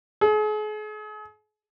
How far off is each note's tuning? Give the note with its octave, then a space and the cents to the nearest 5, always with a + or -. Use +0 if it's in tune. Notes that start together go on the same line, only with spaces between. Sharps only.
G#4 +40